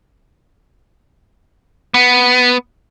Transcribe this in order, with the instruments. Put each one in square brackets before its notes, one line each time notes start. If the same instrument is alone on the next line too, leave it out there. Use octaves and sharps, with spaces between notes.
[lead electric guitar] B3